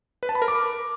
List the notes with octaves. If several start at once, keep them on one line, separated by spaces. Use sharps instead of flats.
B4
A5
B5
A#4
D6